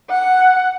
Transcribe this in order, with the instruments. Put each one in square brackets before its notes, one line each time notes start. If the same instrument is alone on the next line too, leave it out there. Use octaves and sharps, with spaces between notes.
[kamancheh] F#5